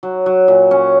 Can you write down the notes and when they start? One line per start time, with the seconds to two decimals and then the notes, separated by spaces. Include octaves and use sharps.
0.03 F#3
0.26 F#3
0.48 A#2
0.71 C#4